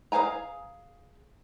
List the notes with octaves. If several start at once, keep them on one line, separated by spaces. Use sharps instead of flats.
G#4 C5 F5 G#5 A#5